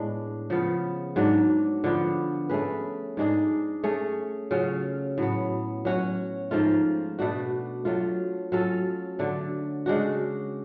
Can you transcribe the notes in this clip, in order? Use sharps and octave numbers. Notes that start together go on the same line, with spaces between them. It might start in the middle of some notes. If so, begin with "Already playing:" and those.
Already playing: A2 G#3 B3 D4
C#3 F3 B3
G#2 F#3 A3 D4
D3 F3 B3
A3 C#4 G#4 B4
G#2 G#3 D4 G#4
A3 C#4 G#4 C#5
C#3 F#3 C#4 F4
A2 F#3 B3
F#3 C#4 F#4 C#5
G#2 F3 A3 F4
B2 A3 D4 F#4
F#3 A3 F4
F#3 C#4 F4 A4
D3 F#3 A3
C#3 G#3 D4 F#4